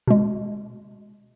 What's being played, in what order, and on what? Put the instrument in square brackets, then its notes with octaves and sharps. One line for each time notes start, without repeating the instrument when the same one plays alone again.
[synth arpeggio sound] B2 G#3